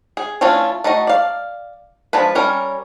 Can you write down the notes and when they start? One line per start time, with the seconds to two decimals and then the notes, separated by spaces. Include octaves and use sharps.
0.17 G#4
0.41 E3 A3 C#4 D4 F4
0.84 A3 D#4 F#4 D#5
1.07 D5 F5
2.13 F3 G#3 D4 B4
2.35 G3 C#4 A#4